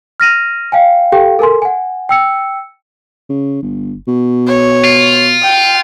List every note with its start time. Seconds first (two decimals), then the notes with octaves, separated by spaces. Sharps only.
0.20 F6 A#6 D#7 F7
0.72 F5 G5 G#5
1.12 G4 A4 F5 G5
1.39 A4 A#4 G#5 C6
1.62 F#5 G#5
2.09 G5 E6 C#7
3.29 C#3
3.62 G1
4.08 B2
4.47 C#5
4.84 F4
5.43 G5